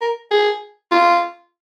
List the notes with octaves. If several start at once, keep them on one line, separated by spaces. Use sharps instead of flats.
A#4
G#4
F4